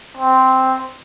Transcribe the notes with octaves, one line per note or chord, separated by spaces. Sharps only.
C4